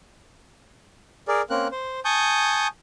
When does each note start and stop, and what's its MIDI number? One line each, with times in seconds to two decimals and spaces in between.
1.28 1.42 68
1.28 1.42 70
1.28 1.42 74
1.50 1.67 58
1.50 1.67 60
1.50 1.67 61
1.50 1.67 70
1.50 1.67 90
1.72 2.00 72
2.05 2.67 80
2.05 2.67 81
2.05 2.67 85
2.05 2.67 87
2.05 2.67 91